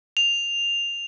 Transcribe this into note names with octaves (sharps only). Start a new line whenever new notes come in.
F7